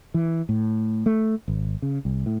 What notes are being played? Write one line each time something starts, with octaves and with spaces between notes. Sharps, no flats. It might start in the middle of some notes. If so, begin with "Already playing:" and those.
E3
A2
A3
G#1
C#3
C2
A2